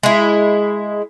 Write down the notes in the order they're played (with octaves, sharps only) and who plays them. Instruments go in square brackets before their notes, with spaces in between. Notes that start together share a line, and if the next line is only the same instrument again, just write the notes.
[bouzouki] G#3 E4